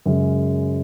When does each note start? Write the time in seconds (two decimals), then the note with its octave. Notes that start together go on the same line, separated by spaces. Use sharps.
0.06 F#2 C#3 G#3